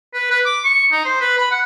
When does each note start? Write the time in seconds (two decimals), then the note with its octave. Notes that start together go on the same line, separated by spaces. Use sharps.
0.14 B4
0.31 B4
0.45 D6
0.64 C#6
0.92 D#4
1.05 C5
1.21 B4
1.38 B5
1.51 F#5